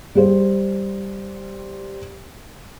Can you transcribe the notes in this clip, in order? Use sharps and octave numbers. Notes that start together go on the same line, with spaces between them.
G3 G4 C5